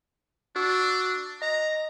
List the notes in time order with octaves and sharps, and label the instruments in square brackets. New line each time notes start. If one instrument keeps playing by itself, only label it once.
[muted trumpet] D4 [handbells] F#4 E6
[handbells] D#5 [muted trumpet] A#5